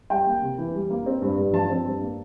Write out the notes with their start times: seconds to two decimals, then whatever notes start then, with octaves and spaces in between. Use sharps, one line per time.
0.10 G3 G5
0.26 A#3
0.42 C3
0.58 E3
0.74 G3
0.90 A#3
1.06 C4
1.22 G2
1.38 G2
1.53 F3 A5
1.70 C4
1.86 G2
2.01 A#3